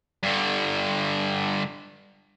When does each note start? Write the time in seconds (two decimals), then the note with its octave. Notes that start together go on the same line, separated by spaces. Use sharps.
0.23 G2 D3